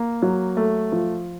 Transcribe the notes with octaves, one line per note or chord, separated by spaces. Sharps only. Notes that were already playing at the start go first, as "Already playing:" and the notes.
Already playing: A#3
F#3
A3
F3